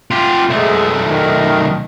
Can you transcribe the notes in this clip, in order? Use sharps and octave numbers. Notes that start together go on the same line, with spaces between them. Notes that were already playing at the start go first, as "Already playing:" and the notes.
F4 G4
B1 G#3 A3
D#3